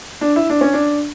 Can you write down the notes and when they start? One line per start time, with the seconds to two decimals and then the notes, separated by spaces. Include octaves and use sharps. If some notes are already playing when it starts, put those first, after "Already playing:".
0.21 D4
0.36 E4
0.50 D4
0.61 C#4
0.73 D4